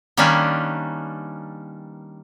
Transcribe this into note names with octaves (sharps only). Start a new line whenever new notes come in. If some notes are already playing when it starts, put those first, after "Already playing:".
D#3 G3 A#3 C#4 D4 B4